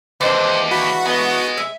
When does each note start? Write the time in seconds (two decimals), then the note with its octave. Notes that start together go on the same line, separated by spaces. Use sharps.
0.21 D#2 E3 G#3 D4 C5
0.71 F#4 B5
1.06 B3 G#4 D#5
1.57 E5